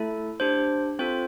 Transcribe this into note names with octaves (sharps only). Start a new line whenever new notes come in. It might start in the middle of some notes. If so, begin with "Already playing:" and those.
Already playing: A3 E4 A4
D4 G4 C5
C4 F4 A4 C5